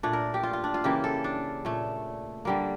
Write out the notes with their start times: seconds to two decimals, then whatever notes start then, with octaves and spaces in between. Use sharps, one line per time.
0.03 A#2 A3 D4
0.13 A#4
0.34 G4
0.43 F4
0.53 F4
0.64 D4
0.74 F4
0.84 C#3 E3 A#3 G4
1.04 A4
1.24 D4
1.65 A#2 A3
2.45 D3 G3 A#3